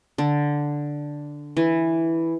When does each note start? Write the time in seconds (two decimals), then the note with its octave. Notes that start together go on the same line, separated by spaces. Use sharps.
0.18 D3
1.57 E3